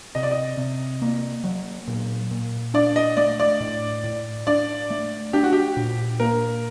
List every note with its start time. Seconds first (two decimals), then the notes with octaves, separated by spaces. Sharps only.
0.15 C3 D#5
0.23 D5
0.31 D#5
0.57 C3
1.02 A#3
1.44 F#3
1.88 A#2
2.31 A#2
2.74 D4 D5
2.96 D#5
3.17 A3 D5
3.40 D5
3.61 A2
4.04 A2
4.47 D4 D5
4.90 A3
5.33 D4 G4
5.43 F#4
5.53 G4
5.77 A#2
6.20 A#3 A#4